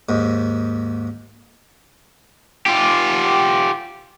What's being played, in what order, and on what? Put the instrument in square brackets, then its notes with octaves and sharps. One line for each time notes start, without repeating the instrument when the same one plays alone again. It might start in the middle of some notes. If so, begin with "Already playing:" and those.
[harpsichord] D#2 G#2
[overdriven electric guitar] F4 G4